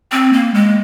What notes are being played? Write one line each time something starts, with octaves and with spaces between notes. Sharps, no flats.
C4
A#3
G#3